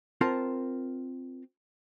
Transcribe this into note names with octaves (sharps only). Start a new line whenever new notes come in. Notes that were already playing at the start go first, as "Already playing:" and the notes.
C4 F4 A#4 A5